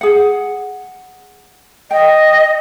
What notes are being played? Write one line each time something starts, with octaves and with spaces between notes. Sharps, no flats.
G#4 F#5
D#5 G5